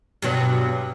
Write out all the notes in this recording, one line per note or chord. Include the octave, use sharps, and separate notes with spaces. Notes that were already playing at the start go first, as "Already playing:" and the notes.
G2 B2 F#3